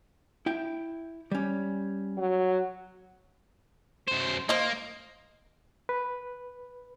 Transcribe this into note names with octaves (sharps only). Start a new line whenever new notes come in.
E4 G5
G3 C#4
F#3
F#2 C5
A#3 C5 D#5
B4